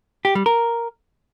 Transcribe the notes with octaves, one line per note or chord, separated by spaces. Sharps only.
G4
G3
A#4